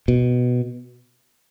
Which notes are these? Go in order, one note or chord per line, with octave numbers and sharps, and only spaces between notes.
B2